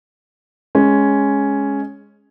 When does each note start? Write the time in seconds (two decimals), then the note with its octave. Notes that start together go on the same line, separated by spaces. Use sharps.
0.75 G#3 C#4